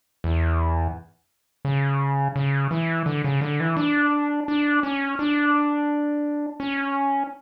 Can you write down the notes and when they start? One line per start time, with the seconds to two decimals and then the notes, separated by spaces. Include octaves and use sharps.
0.24 E2
1.65 C#3
2.36 C#3
2.71 E3
3.06 D3
3.24 C#3
3.41 D3
3.60 E3
3.77 D4
4.48 D4
4.83 C#4
5.19 D4
6.60 C#4